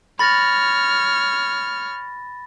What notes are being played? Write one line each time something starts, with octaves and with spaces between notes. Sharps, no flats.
C#5 B5 F6 A6 A#6